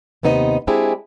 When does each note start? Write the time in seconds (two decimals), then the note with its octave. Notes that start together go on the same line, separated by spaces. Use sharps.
0.23 D#2 C3 B3 D#4 G#4 D#5
0.67 G#3 C4 D4 E4 G4 G#4